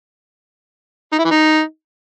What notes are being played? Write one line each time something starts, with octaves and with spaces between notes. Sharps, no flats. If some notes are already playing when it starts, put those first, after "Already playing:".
D#4
E4
E3
D#4